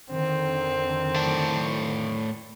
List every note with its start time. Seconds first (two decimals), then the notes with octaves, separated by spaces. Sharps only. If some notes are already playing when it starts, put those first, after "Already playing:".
0.11 F2 D3 D#3 C4
1.15 A2 D5 A5